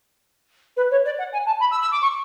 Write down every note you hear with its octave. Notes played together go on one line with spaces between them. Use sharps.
B4
C#5
D5
F#5
G#5
A5
B5
E6
E6
D6
C#6